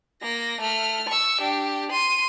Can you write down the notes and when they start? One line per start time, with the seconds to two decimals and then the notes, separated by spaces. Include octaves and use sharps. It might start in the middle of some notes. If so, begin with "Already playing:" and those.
0.22 A#3 A#6
0.61 A3 F6
1.09 C#6 E6
1.41 D4 G4
1.92 C6 D#7